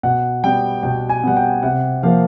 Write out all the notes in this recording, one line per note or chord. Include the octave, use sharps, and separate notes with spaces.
B2 F#5
G3 B3 G5
B2 G5
G#5
G3 B3 F#5
G5
C3 F#5
F3 A#3 F5